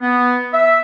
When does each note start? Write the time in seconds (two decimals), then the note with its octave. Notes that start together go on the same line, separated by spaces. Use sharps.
0.02 B3
0.53 E5